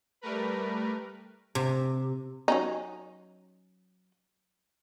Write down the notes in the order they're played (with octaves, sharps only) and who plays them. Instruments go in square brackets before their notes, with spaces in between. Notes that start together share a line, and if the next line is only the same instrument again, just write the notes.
[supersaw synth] G3 A3 A#4 B4
[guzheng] C3
[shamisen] F#3 C#4 D#4